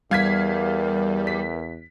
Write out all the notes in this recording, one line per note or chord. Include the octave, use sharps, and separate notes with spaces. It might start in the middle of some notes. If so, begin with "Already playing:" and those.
E2 G3 A#4 F5 G#6 B6
B6